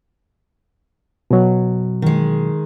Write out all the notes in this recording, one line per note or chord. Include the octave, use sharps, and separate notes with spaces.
B2 F#3
D#3 G#3